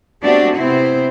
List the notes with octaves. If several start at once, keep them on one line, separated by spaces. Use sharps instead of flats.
A3 B3 C4 D4 F#4 G4
C3 B3 C4 E4 C5